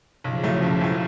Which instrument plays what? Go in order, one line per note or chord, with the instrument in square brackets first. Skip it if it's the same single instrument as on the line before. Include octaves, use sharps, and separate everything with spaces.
[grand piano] B1 [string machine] C#3 F3
[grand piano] A2 F#3 A3
B1
A2 F#3 A3